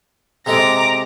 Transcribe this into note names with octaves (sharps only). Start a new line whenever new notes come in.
C3 G#3 A4 A#5 D6